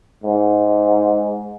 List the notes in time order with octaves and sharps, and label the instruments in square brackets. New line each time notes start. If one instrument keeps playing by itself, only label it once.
[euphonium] G#2